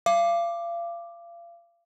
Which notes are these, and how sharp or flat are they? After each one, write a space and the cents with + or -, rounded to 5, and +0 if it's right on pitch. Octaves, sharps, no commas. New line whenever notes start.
F5 -35 D6 +5